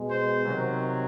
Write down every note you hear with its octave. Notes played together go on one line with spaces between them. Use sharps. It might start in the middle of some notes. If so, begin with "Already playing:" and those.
Already playing: B2 G#3
C5
C3 D#3 F#3